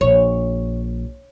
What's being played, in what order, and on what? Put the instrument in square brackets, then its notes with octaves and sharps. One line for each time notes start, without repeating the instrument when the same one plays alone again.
[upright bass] A#1 [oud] C#5